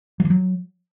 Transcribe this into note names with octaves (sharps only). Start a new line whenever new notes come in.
F#3
F3
F#3